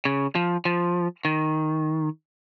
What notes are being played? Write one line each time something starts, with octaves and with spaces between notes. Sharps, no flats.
C#3
F3
F3
D#3